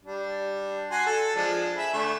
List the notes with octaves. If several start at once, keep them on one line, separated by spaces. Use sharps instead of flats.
G3 D4
F#4 G#5 C6
A4
F3 G#3 D4
E5 G#5 B5
D3 A3 C#6